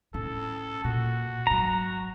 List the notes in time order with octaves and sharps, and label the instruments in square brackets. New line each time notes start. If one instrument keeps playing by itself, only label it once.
[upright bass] A2 C#4 [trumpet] A4
[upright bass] A#2 [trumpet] F#4
[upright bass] G#1 F#3 [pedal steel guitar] A#5